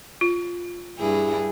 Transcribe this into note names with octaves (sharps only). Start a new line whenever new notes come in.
F4
G2 E4 G#4